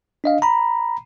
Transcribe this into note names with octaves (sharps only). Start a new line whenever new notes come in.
D4 D#5 F5
A#5 B5